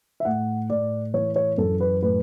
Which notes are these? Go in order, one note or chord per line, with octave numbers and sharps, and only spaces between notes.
E5
A2 F#5
A2 D5
E3 C#5
C#5
F#2 A4
B4
A2 B4